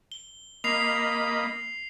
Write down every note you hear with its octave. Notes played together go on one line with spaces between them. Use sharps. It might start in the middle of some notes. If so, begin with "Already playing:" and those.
G7
A#3 D#5 B5 C7 F7